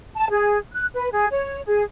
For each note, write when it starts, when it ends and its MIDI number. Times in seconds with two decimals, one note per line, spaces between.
0.15 0.26 81
0.31 0.58 68
0.73 0.86 90
0.94 1.08 71
1.12 1.27 68
1.30 1.61 73
1.65 1.83 68